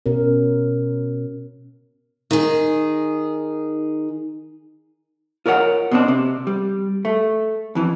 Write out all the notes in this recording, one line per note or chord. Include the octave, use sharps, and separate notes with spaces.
B2 C#4 A#4
D#3 G#4
F4 A#4 C#5 D5 F#5
B2 C4 D4
C3
G3
A3
F2 E3